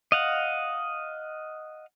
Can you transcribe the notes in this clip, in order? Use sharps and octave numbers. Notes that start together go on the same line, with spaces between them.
D#5 F5 F#5